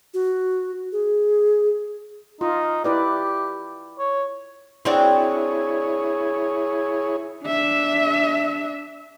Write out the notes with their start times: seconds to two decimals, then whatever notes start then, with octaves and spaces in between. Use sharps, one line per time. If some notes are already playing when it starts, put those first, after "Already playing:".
0.14 F#4
0.92 G#4
2.41 D#4 F4
2.84 E4 G4 B4 D5
3.99 C#5
4.85 C4 D4 E4 F#4 G#4 C#5
7.45 D4 E5